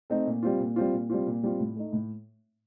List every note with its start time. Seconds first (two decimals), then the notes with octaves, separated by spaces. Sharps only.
0.10 A3 C4 D#4
0.27 A#2
0.43 G3 C4 F4
0.60 A#2
0.76 G3 C4 F4
0.93 A#2
1.10 G3 C4 F4
1.27 A#2
1.43 G3 C4 F4
1.60 A2
1.76 A3 D#4
1.93 A2